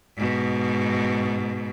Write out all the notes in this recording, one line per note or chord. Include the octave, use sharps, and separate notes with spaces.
G#2 B2